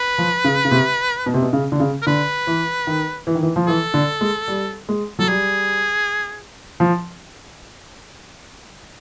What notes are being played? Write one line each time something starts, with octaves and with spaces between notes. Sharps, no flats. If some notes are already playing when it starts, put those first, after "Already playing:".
Already playing: B4
F3
C#3
C#3
C3
B2
C3
B2
C#3
D3
C#3
A#4
D3 B4
E3
D#3
E3
D#3
E3
F3
E3 A4
D3
G#3
G3
G#3
F#3 A4
G3 G#4
F3